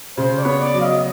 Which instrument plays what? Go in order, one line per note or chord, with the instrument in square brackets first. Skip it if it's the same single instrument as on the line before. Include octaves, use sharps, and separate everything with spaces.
[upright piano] C#3 [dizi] C5
[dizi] D5
[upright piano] B3 [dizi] C#5
[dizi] D5
[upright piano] F#3
[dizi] F5
D#5